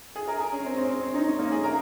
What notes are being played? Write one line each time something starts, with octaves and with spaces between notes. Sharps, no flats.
G#4
A#4
G#4
C#4
C4
C4
C4
C#4
D#4
C#4
A#3
G#4
A#4